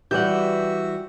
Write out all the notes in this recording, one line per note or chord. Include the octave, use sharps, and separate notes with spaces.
E3 G3 F#4 G4 D5 E5 F#5 G6